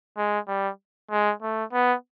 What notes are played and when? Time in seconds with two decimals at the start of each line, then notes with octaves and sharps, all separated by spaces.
0.17 G#3
0.48 G3
1.11 G#3
1.42 A3
1.73 B3